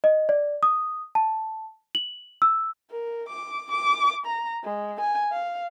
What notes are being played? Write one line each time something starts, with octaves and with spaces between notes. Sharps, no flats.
D#5
D5
D#6
A5
F#7
E6
A#4
D6
D6
A#5
G#3
G#5
F5